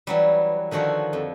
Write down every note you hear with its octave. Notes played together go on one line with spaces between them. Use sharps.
E3 F#3 G3
D3 D#3 F3 F#4 C#5 E5
F2